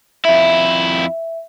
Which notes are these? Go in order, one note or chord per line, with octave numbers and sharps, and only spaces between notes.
F2 E4 E5